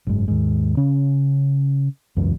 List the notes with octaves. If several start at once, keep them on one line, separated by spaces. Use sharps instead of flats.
F#1 G#2
D#2 G#2
C#3 C#4
E1 C#2 F#2 E3